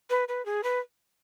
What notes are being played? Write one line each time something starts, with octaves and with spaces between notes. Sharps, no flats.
B4
B4
G#4
B4